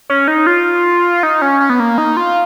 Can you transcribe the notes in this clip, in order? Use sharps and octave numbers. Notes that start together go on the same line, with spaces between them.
C#4
D#4
F4
D#4
C#4
C#4
B3
A#3
D#4
F4